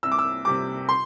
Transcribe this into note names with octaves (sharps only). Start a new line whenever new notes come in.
C2 E6
D6
E6
C3 G3 D6
C6